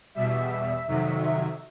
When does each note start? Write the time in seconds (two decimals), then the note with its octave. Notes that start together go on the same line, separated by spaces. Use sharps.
0.15 E2 B2 G3 E5
0.88 F2 C3 D#3 F#3